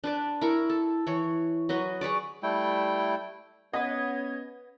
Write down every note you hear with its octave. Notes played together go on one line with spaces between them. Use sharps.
D4 B4 D5
E4 A#4 C#6
A4
E3 C#5
F#3 F#4 B4 D#5
G#4 B4 C#5 D5
G3 A3 E4 G5
B3 C#4 B4 D#5 F#5 G#6